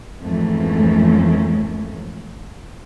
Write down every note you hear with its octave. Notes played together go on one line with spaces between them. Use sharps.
F2 G#2 E3 A3 A#3 C#4